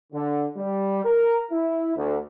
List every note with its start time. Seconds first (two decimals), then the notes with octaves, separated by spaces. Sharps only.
0.13 D3
0.56 G3
1.04 A#4
1.51 E4
1.96 D2